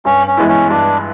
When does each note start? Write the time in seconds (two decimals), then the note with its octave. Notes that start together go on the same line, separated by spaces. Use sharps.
0.05 G2 C#4
0.27 C#4
0.37 E3 G#3 B3 E4
0.48 C#4
0.70 G2 D4